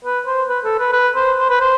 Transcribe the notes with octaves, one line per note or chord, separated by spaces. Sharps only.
B4
C5
B4
A4
B4
B4
C5
C5
B4
C5